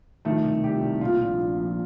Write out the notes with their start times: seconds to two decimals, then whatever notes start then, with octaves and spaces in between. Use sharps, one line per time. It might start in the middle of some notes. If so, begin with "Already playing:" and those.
0.25 D#3 A3 A4
0.44 C2
0.63 C2 G4
0.81 C2
1.01 A#2 F4
1.20 A#1
1.39 A#1
1.58 F3